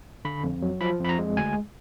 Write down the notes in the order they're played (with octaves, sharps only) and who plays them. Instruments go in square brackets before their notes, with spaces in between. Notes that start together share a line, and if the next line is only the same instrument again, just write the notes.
[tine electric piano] D3 B5
F2
F#3
F3 B5
F2
B5
A#5
G#3
D2 G#5